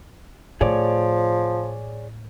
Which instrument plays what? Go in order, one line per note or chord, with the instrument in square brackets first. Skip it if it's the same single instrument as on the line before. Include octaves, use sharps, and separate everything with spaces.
[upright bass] A2 [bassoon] F3 [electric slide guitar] G#4 C#5 D5